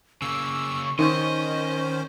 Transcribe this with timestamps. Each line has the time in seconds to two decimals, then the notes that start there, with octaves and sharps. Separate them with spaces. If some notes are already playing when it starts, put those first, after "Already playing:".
0.22 C#3 A#3 C#6 E6
0.99 D#3 C#4 D#4 C5 D#5